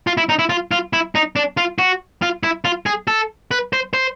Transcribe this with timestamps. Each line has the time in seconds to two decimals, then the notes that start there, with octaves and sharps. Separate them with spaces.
0.07 F4
0.17 E4
0.29 D#4
0.39 E4
0.50 F4
0.72 F4
0.93 E4
1.15 D#4
1.36 D4
1.57 F4
1.79 F#4
2.22 F4
2.43 E4
2.65 F4
2.86 G#4
3.08 A4
3.51 B4
3.73 C5
3.94 C5